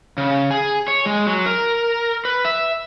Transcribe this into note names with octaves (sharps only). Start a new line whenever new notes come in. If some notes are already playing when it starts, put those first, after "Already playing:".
C#3
G#4
C#5
G#3
F#3
A#4
B4
E5